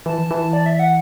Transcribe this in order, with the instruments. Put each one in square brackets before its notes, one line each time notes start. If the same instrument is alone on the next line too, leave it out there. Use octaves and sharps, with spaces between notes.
[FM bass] E3 [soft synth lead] A5
[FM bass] E3
[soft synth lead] D5
E5
F#5